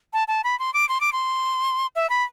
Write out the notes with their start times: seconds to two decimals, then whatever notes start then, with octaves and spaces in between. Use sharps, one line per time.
0.13 A5
0.28 A5
0.44 B5
0.59 C6
0.74 D6
0.89 C6
1.00 D6
1.12 C6
1.95 E5
2.09 B5